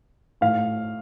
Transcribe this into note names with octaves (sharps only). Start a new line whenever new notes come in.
A2 F5